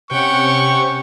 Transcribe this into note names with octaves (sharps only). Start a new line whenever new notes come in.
C3 C#4 G4 F#5 G5 C#6